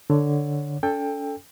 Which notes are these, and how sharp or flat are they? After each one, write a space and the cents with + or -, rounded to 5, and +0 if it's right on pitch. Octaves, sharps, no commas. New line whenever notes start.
D3 +0 C#5 +0
C#4 +45 A4 +0 G5 +20